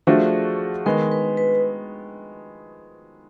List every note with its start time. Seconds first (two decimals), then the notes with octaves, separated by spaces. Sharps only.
0.07 F3 A3 D4 F#4 G#4
0.86 D#3 G#3 B3 A#4
1.12 B4
1.37 B4